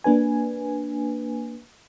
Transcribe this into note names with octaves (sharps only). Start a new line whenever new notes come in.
A#3 D4 B4 G#5